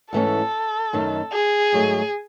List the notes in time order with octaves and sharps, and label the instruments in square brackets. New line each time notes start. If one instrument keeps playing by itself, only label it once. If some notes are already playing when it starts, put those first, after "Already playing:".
[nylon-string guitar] G#2 E3 A3 C#4 [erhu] A4
[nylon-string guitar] F#2 D#3 A3 D#4
[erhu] G#4
[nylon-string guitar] G#2 F#3 A3 D#4